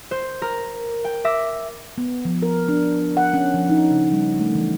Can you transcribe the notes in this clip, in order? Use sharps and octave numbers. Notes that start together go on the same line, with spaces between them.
C5
A#4
G5
E5 D6 A#6
B3
F3
A#4
D4
F#5
C#4
F3
D#4
C#3
G3
A3
E3